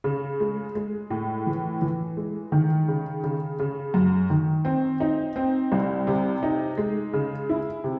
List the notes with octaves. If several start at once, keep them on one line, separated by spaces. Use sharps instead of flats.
C#3
G#3
G#3
A2
E3
E3
G#3
D#3
C#3
C#3
C#3
F#2
D#3
C4
D#4
C4
C2
C3
D#4
G#3
C#3
E4
C3